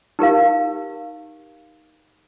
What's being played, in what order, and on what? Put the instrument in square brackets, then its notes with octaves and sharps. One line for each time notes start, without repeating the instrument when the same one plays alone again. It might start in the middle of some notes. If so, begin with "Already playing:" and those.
[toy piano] D#4 G4 A#4 F5